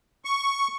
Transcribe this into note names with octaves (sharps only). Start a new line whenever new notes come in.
C#6